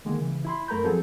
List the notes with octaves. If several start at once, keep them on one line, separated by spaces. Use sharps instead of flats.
D3 D#3 G#3 A#3
C#3 E3
E4 B5 C6
F#2 A3 A#4 A#5 B5 G6
F3 F#3 C4 G#4 A4